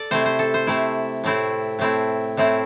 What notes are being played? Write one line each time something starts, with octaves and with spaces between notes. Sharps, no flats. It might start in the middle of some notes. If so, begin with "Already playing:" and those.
Already playing: A4 D5
C3 A3 E4 C5
C5
A4
C5
C3 A3 E4
A2 A3 C4 E4
A2 A3 C4 E4
A2 A3 C4 E4